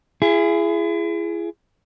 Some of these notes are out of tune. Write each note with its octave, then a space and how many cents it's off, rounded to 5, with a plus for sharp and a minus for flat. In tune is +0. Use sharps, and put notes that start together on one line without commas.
E4 +40 G#4 +0